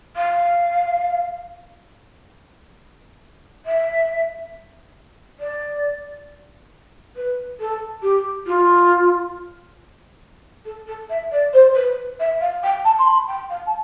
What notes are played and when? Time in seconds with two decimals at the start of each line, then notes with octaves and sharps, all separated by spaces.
0.16 F5
3.66 E5
5.40 D5
7.16 B4
7.60 A4
8.02 G4
8.46 F4
10.65 A4
10.87 A4
11.09 E5
11.31 D5
11.53 C5
11.75 B4
12.19 E5
12.41 F5
12.63 G5
12.84 A5
12.98 C6
13.07 B5
13.28 G5
13.49 F5
13.66 A5